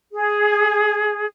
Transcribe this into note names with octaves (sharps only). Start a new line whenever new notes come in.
G#4